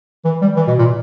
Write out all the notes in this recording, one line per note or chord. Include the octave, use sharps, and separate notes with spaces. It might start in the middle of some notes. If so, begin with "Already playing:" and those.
E3
G3
E3
B2
A#2